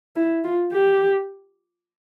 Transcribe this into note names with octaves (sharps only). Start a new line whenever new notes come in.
E4
F4
G4